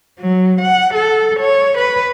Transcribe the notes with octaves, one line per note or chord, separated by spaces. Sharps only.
F#3
F#5
A4
C#5
B4